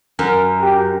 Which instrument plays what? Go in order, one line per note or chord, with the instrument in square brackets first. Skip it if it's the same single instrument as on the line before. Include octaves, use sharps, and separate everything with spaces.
[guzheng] F#2 [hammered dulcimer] A#4
[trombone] G4